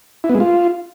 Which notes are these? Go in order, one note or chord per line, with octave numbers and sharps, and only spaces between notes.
E4
B3
G#3
F4